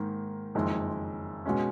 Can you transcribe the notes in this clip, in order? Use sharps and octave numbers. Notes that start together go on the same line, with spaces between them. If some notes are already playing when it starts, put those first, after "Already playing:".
Already playing: G#2 D#3 A#3
F#1 F2 D#3 G#3
B2 G#3 C#4